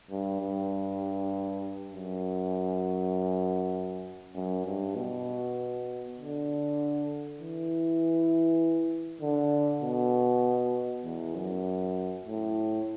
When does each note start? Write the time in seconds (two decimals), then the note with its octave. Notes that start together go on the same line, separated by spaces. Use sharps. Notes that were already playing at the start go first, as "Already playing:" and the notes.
0.10 G2
0.41 G2
1.92 F#2
4.35 F#2
4.66 G2
4.95 B2
6.17 D3
7.40 E3
9.21 D3
9.82 B2
11.04 E2
11.35 F#2
12.26 A2